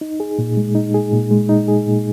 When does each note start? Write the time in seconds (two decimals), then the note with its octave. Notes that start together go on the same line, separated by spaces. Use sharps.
0.01 D#4
0.20 G#4
0.39 A#2
0.57 G#3
0.75 D#4
0.94 G#4
1.13 A#2
1.31 G#3
1.49 D#4
1.68 G#4
1.86 A#2